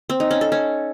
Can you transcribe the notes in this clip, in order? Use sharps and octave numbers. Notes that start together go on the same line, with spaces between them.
C4
D#4
C#4
A4
C#4